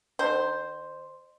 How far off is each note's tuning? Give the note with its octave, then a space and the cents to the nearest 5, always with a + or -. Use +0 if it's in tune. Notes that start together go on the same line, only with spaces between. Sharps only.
D#3 -40 C5 +0